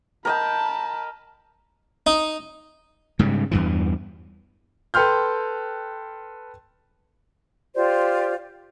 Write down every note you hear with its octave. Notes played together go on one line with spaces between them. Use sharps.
A#4 D#5 G5 A5 B5
D#4
G#2 C#3 G3
E2 G2 E3
A4 B4 G5 C6 F6 G6
F4 G4 C5 D5